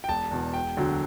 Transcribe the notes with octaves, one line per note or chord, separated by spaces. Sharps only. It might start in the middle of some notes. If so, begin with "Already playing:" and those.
G5
E1 A5
E2 B2
E1 G5
D2 D3 F#3